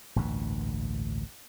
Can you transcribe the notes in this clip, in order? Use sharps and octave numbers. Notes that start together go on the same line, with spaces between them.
A1 D2 G2 A#2